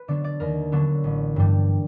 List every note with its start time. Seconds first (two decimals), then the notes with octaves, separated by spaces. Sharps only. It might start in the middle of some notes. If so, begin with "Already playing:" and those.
Already playing: B4
0.08 D3 F#3 B3 D4 D5
0.24 D5
0.40 D#2 A#4
0.72 D3 F#3 B3 D4
1.04 A1
1.36 G2 E3 G3